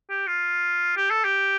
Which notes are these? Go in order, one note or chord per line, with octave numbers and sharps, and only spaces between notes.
G4
F4
G4
A4
G4